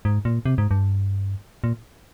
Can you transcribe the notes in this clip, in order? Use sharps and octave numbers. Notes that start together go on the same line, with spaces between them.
G#2
A#2
C3
G#2
G2
A#2